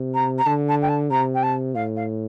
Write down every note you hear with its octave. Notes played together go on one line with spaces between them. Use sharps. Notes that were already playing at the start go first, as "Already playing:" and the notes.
Already playing: C3
A#5
A#5
D3 A5
A5
G5
A5
C3 A#5
G5
A5
A2 F5
F5